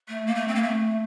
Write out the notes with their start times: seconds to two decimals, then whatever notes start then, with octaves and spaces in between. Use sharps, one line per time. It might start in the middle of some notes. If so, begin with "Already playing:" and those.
0.08 A3
0.27 A#3
0.35 A3
0.48 C4
0.55 A#3
0.63 A3